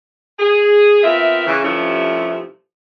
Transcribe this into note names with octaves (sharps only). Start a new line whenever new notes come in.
G#4
B3 C4 F4 A#4 E5
C#3 E3
G2 C3 F3 A3 C#4 E4